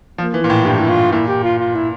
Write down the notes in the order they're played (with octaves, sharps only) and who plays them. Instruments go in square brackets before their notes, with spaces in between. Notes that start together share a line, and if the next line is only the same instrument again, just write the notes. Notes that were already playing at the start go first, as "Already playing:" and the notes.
[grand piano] F3 [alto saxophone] A#3
[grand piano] E3
[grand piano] A#2 [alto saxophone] E4
[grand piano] A2
[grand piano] G2 [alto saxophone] G4
[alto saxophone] E4
[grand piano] A2 [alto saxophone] F4
[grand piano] A#2 [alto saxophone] E4
[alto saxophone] G4
F4
F4
E4